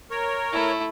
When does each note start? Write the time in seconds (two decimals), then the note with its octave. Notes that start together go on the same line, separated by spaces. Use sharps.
0.10 A#4 C#5
0.52 A3 E4